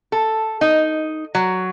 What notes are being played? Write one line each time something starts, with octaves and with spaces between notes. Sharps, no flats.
A4
D#4
F#3